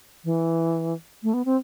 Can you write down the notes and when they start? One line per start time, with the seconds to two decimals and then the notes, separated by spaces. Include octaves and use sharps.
0.24 E3
1.23 A3
1.34 B3
1.45 C4